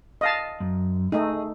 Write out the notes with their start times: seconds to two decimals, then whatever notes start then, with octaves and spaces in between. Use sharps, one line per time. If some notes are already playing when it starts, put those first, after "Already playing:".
0.21 D#5 F5 A5
0.60 F#2
1.12 A3 D#4 G#4